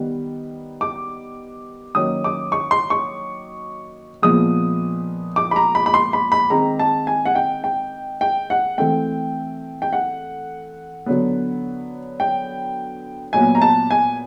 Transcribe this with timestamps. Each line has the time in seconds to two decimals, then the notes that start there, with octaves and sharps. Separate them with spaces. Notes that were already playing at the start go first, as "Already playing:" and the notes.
Already playing: D#3 G3 B3
0.81 D6
1.95 D#3 F#3 A#3 C#4 D#6
2.24 D6
2.52 C#6
2.71 C6
2.90 C#6
4.22 A#2 F3 G#3 B3 D#6
5.36 D6
5.51 B5
5.56 A#5
5.75 B5
5.86 B5
5.94 C6
6.13 B5
6.32 B5
6.50 D#3 G#3 C4 A#5
6.79 A5
7.07 G#5
7.25 F#5
7.35 G5
7.64 G5
8.21 G5
8.50 F#5
8.78 E3 A3 C4 G5
9.82 G5
9.93 F#5
11.06 D3 F#3 B3
12.20 G5
13.33 A#2 F#3 B3 G#5
13.55 A#5
13.62 A5
13.91 G#5